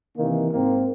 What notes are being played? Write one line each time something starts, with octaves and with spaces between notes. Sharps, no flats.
C3 D#3 E3 A#3
G#2 A#3 C4